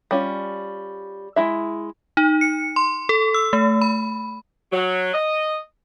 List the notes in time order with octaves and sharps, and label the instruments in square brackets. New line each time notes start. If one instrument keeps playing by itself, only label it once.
[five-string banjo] G3 C#4 F4
G#3 E4 E5
[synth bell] D#4
C#7
C6
A4
E6
A3
B5
[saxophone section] F#3
D#5